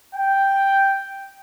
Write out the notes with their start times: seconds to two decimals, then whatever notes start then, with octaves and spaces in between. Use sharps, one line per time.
0.14 G5